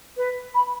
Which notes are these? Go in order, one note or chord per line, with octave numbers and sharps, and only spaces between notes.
B4
B5